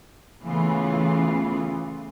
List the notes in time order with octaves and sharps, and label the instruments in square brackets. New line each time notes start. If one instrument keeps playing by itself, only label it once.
[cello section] C#3 E3 A3 B3 F4